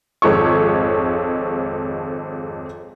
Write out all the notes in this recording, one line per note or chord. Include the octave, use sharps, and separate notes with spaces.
G#1 F2 G#3 A4 C#5 C#6